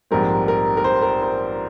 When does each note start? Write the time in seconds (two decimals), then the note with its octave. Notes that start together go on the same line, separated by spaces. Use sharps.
0.11 A#1 G#2 G3 C4 A#4
0.48 A#4
0.77 A#4
0.84 C5
1.02 A#4
1.22 C5